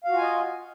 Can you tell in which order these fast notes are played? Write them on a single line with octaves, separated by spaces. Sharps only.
F5 F#4 F4 G#5 D#5